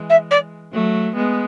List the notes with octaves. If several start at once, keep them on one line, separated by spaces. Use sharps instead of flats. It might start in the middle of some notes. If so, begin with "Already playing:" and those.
Already playing: E3 G#3
E5
D5
F#3 A3
G#3 B3